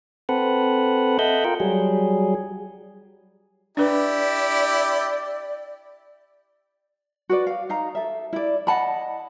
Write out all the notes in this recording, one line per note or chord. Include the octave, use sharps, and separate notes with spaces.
C4 A4 B4 F#5
A4 D#5 E5 F#5 G6
F4 A#4 G5
F#3 G3 G#4
D4 E4 G4 B4 D5
F#4 B4 D5
F5
D#4 F5 A#5
A4 E5
E4 D5
D#5 F#5 A5 B5